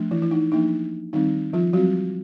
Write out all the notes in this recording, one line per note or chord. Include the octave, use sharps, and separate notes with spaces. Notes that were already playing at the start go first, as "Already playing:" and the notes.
Already playing: F3 A3 D4
E3 E4
E4
D#4
F3 A#3 D4 D#4
D#3 G3 C4 D#4
F3 F4
F#3 G3 C4 F#4